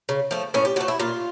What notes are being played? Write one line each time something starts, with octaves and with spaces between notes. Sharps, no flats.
C#3
F3 A3
A2 C#4
G4
F3 A3 F#4
E4
A#2 F4